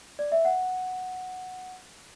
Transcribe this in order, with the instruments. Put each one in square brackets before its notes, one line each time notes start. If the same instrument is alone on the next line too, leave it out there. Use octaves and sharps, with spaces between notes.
[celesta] D5
E5
F#5